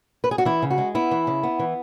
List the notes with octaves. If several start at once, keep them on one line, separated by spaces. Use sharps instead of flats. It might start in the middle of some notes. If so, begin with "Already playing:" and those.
B4
G#4
F#4
E3 E4
C#3
F#4
G#3
B3 E4
E3
C#3
B3
E3